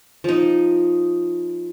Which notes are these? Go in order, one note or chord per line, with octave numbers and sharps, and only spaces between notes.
F3 D#4